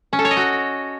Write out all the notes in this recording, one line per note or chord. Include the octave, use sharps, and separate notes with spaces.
C#4
A4
C#5
D#5
F#4